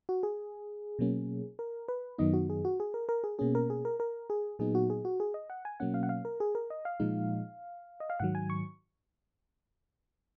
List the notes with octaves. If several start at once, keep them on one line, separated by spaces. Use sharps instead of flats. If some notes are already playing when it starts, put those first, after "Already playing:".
F#4
G#4
B2 F#3 A#3 C#4
A#4
B4
F#2 D#3 F#3 B3 D#4 D#5
F#4
G#4
F#4
G#4
A#4
A#4
G#4
B2 A#3 C#4 G#4
A#4
G#4
A#4
A#4
G#4
A#2 F#3 B3 D#4 G#4
F#4
G#4
F#4
G#4
D#5
F#5
G#5
B2 F#3 A#3 C#4 F#5
F5
F#5
F5
A#4
G#4
A#4
D#5
F5
A#2 F3 G#3 D#4
D#5
F5
G#2 D#3 F#3 F#5
G#5
C#6